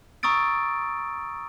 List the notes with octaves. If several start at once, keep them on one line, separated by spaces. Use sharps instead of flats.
A#5 C#6 D#6 E6 A6 D7